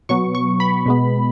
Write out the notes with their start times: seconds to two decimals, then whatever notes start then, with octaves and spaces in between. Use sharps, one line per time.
0.09 B2 F#3 B3 C#6
0.35 C#6
0.60 B5
0.86 B2 G#3 B3